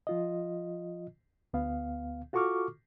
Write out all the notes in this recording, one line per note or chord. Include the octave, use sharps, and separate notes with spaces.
F3 F4 D#5
D2 B3 F5
F4 F#4 A4 C#6 D6 F6